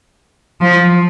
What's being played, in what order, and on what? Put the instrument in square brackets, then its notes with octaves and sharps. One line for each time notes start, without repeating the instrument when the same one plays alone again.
[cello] F3